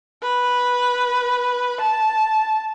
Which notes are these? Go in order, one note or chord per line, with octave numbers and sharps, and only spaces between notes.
B4
A5